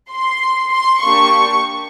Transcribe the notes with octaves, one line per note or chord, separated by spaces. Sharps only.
C6
C6
A#3 D4 G4 C#6